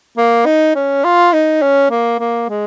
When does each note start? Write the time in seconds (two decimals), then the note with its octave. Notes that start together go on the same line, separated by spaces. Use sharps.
0.18 A#3
0.46 D#4
0.75 C#4
1.05 F4
1.33 D#4
1.62 C#4
1.91 A#3
2.20 A#3
2.49 G#3